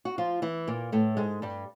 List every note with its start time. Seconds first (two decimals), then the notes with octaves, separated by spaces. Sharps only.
0.05 F#4
0.18 F3 F4
0.42 E3 E4
0.67 A#2 A#3
0.92 A2 A3
1.17 G#2 G#3
1.42 G2 G3